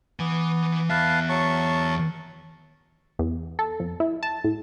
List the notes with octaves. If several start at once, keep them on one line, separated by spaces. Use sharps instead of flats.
E3 B3 G#5
E2 B4 E5 F5 A5
F#3 A5 C#6
E2
A4
F2
E4
A5
A2